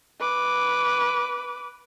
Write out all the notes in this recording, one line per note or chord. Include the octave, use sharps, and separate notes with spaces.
B4 D6